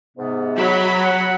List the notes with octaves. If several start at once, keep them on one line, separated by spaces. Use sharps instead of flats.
G#2 C3 B3
F#3 B5
F#5